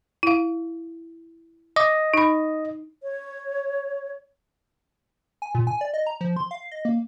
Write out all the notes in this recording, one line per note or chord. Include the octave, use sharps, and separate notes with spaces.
E4 F5
D#5 D6
D#4 B5
C#5
G#5
A#2
G#5
D5
D#5
A#5
F3
C6
F5
D#5
A#3